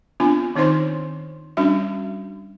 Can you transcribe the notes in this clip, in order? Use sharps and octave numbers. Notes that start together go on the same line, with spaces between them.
B3 C4 D4 F4 G#5
D#3 C4 D#4 C5 C6
G3 C#4 D4 F#4 E5